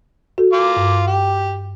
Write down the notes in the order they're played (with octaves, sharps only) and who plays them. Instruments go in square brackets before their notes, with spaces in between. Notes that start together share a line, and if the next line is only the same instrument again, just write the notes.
[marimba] F#4 A4
[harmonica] F4 D6
[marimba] G2
[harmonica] G4